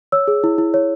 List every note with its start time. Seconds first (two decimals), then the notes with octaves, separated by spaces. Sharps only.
0.12 C#5 E6
0.28 G#4
0.44 E4
0.58 E4
0.74 C#5